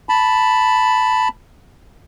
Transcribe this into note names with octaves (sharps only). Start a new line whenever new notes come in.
A5 B5